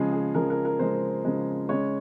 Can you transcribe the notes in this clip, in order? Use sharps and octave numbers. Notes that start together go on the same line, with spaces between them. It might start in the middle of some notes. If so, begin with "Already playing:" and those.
Already playing: C#3 F3 G#3 G#4
G#4
C#3 F3 G#3 A#4
A#4
A#4
C#3 F3 G#3 C5
C#3 F3 G#3
C#3 G#3 C#5